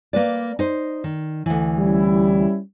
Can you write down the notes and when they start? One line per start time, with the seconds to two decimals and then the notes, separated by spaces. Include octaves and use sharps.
0.13 A#3 B4 D5
0.59 D#4 C5
1.04 D#3
1.46 D2 E3
1.78 G3 C#4 E4